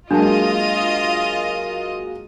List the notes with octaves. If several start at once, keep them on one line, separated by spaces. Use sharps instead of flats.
F#3 G#3 A#3 D4 F4 D#5 A5